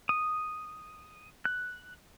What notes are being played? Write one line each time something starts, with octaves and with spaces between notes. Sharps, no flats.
D#6
F#6